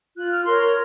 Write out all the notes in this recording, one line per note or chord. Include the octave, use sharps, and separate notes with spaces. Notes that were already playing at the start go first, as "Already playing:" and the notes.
F4 F#6
F6
A#4 C#5 C6